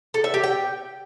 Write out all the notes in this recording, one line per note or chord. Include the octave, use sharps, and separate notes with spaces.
A4
E5
G4
G5